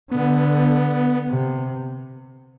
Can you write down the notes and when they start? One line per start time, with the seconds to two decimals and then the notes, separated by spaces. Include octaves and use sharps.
0.11 D3 B3
1.30 C3